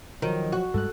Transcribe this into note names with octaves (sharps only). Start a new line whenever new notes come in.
D#3 F3 F#3
F#4
G2 G3 G#3 A4 F#6